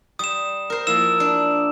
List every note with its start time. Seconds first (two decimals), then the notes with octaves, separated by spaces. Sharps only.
0.19 G3 D#6 E7
0.70 A#4 C5
0.87 F3 A#3 E4 E6 E7
1.20 D4